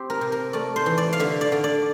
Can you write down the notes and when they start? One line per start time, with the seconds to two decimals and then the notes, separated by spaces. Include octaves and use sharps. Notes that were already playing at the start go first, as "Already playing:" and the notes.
Already playing: C4 G4
0.10 A#4
0.21 C3
0.32 A#4
0.53 A3 D5
0.76 C5
0.86 E3
0.98 D5
1.13 F5
1.19 D3 E5
1.41 D5
1.52 D3
1.64 D5